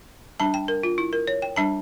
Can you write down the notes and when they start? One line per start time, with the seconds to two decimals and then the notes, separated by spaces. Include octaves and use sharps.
0.40 G3 D4 A5
0.54 G5
0.68 A#4
0.83 F4
0.98 E4
1.13 A#4
1.27 C#5
1.42 G5
1.56 G3 D4 A5